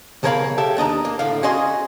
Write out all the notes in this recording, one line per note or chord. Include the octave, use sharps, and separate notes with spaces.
B1 C#3 A#4 C#5 F5 B5
G4 A4 E5
D#2 D4 D#5 A#5
A#3
A2 D3 F5
C#4 F#4 G#4 D#5 C6